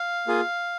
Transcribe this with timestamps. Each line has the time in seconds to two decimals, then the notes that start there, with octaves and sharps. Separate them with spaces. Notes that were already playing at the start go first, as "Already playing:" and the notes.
Already playing: F5
0.27 A#3 F4 G#4